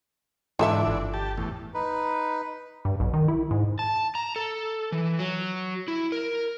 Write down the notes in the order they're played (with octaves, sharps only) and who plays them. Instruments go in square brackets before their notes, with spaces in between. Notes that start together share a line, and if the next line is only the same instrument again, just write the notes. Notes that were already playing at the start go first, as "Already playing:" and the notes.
[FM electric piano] G#2 [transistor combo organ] D3 E3 D4 [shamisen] F4 A4 E5
[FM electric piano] G1
[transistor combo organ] G4 A5
E2 A2
[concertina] D#4 B4
[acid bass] G2
B1
D#3
E4
G#2
[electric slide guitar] A5
A#5
A4
E3
F#3
E4
A#4